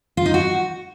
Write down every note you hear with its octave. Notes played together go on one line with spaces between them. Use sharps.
F4
D#4
F#4